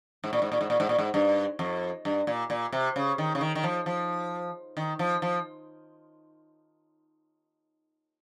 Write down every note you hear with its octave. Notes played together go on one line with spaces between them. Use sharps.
G#2
A#2
G#2
A#2
G#2
A#2
G#2
A#2
G#2
G2
F2
G2
A#2
A#2
C3
C#3
D#3
C#3
D#3
D#3
F3
F3
D#3
F3
F3